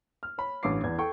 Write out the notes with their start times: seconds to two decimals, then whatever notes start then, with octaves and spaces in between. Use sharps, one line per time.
0.23 F6
0.38 C#5 B5
0.63 A1 G2 C#5 D6 C7
0.84 E2 D5 G#6
0.98 A4 G5 C#6